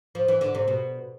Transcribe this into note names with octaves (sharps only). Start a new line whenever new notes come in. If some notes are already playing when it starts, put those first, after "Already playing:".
F3
E3
D3
C3
B2